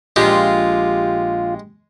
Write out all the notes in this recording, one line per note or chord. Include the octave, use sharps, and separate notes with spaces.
A#1 G#3 F4 G4